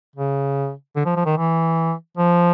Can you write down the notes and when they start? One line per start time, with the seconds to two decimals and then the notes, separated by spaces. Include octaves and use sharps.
0.16 C#3
0.96 D3
1.06 F3
1.16 F3
1.26 D#3
1.37 E3
2.17 F3